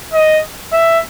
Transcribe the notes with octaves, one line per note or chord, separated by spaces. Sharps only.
D#5
E5